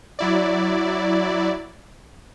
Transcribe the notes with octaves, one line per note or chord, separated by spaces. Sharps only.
F#3 E4 D5